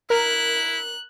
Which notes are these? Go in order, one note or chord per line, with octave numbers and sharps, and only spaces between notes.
E4 A#4 F#6